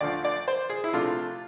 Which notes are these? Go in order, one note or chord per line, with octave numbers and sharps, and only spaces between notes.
D2 D3 F3 D5
D5
C5
G#4
E4
C3 F3 A3 D4 F4